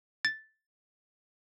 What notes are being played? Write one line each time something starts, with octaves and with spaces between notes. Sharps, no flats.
A6